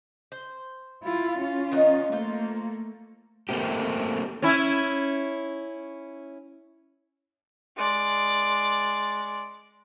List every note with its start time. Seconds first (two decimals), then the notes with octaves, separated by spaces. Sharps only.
0.32 C5
1.03 E4 F4
1.38 C#4 F4
1.72 D#3 B3 D#4
2.12 A3 A#3 F4 C5
3.49 A3 A#3 C4 G4
4.42 C#4 E4
7.77 G#3 D5